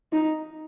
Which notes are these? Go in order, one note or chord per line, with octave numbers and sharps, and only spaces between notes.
D#4